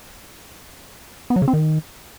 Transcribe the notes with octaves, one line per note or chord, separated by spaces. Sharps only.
B3
F#3
C#3
C4
D#3